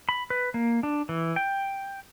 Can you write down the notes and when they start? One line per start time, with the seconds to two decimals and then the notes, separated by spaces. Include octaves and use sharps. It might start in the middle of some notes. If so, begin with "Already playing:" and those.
0.09 B5
0.30 B4
0.54 A#3
0.83 D4
1.09 E3
1.36 G5